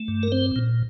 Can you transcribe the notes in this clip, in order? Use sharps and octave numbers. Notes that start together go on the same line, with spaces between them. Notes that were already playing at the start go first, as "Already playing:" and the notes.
Already playing: A3
G2
A#4
C4 C5
A#2